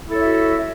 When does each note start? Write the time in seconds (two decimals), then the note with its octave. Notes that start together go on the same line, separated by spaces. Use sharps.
0.05 E4
0.09 A4
0.14 C#5
0.19 E5
0.24 F#4